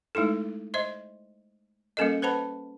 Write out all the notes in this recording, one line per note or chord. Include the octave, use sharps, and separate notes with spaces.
G#3 A3 D#4 E4 A4
C5 D#5 E5 C6
G3 A#3 C#4 A4 A#4 D#5
B4 C5 F#5 A5 B5